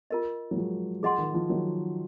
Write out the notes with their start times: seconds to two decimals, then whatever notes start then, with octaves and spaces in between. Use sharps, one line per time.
0.11 F4 A#4 D#5
0.51 F#3
0.57 F3 G#3
1.03 F3 G#4 D#5 F#5 C6
1.18 D#3
1.34 F3
1.49 D#3 F#3